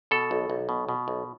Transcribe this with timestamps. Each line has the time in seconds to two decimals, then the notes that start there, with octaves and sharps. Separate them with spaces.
0.11 B2 A4
0.31 B1
0.50 B1
0.69 B2
0.89 B2
1.08 B1